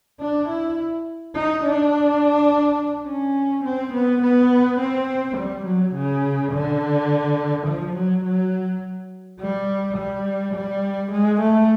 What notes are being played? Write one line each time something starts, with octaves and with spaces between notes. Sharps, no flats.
D4
E4
D#4
D4
C#4
C4
B3
B3
C4
G3
F#3
C#3
D3
F3
F#3
F#3
G3
G3
G3
G#3
A3